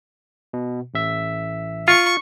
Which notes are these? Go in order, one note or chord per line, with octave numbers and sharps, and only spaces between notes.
B2
A1 E5
F4 C#6